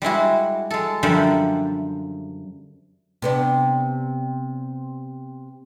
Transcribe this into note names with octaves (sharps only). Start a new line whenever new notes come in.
G3 G#3 E4 F#4
G#3 A4
F#2 D3 F3 G3 E5 F#5
C3 B3 D4